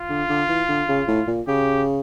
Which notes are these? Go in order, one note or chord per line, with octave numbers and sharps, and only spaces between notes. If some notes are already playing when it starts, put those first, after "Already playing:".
Already playing: F4
D3
D3
E3
D3
C#3
A2
A#2
C#3 G4